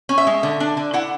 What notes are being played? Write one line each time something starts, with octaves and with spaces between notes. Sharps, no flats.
C#4
E5
G#3
D3
D4
D3
E4 F#5